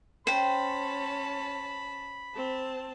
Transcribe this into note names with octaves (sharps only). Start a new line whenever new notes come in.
C#4 C5 G5 A5 B5
C4 A5